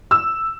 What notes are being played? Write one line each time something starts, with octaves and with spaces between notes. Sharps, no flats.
E6